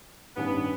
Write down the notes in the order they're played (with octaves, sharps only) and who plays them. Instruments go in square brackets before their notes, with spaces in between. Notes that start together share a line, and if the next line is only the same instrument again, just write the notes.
[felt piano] G2 D#3 G3 C#4 [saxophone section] B3